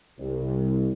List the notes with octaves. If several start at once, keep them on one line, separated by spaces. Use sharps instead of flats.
C2